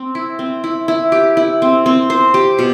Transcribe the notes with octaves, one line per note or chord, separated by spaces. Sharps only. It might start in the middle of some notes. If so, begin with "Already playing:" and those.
Already playing: C4
E4
C4
E4
E4
G4
E4
C4
C4
C5
G4
B2